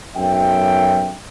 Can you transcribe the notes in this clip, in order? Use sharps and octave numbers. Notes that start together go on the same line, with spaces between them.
B1 F#2 E5 G5